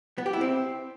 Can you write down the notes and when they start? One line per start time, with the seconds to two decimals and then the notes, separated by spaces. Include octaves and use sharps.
0.18 B3
0.26 G4
0.33 E4
0.41 C4